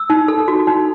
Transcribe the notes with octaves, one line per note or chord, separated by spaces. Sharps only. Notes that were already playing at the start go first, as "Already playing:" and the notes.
Already playing: E6
D#4
A4
F#4
D#4